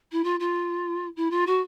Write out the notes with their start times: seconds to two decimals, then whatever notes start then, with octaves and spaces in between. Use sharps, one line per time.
0.12 E4
0.23 F4
0.39 F4
1.16 E4
1.30 F4
1.46 F#4